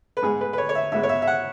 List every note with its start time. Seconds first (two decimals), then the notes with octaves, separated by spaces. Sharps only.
0.17 B4
0.22 G#2 G#3 B3 G#4
0.41 B4
0.53 B4
0.58 C#5
0.69 C#5
0.75 E5
0.92 G#2 G#3 B3 E5
1.03 C#5
1.09 E5
1.22 E5
1.27 F#5